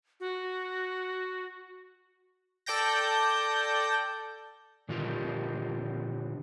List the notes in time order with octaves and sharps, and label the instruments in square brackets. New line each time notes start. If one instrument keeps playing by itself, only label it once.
[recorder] F#4
[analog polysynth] A4 D5 G5 G6 A#6
[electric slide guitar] A#2 D3 D#3 F4 G4